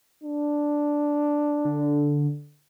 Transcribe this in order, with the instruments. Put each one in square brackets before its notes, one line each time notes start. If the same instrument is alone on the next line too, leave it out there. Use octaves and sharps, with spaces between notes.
[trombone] D4
[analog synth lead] D3